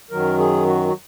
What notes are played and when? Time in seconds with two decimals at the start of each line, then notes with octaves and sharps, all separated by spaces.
0.11 F#2 D#3 F#3 A#4
0.39 G#4
0.66 F#4
0.88 F#4